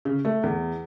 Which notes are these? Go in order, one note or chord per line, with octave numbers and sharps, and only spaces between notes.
C#3
A3
E2